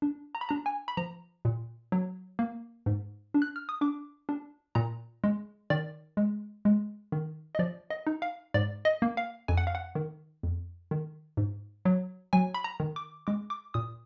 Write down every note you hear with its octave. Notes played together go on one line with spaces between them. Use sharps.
D4
A#5
B5
D4 A#5
G#5
B5
F3 A#5
A#2
F#3
A#3
G#2
D4
F#6
F6
D#6
D4 D6
D4
A#2 A#5
G#3
D#3 D5
G#3
G#3
D#3
D#5
F3 D5
D#5
D#4
F5
G#2 D5
D#5
A#3
F5
F2 G#5
F#5
F5
F#5
D#3
F2
D#3
G#2
F#3
F#3 G#5
B5
A#5
D#3
D6
G#3 D6
D6
A#2 D#6